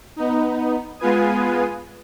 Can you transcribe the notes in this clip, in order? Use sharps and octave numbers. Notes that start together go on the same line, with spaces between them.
B3 D#4
G#3 B3 F4 B4 G#5 D#6